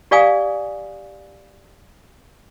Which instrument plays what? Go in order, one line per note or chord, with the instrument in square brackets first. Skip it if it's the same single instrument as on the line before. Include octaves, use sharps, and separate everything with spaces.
[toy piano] G4 D5 F5 G#5 D#6